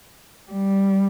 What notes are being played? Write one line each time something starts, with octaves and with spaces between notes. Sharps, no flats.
G3